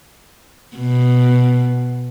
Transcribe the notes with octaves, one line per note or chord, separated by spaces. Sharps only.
B2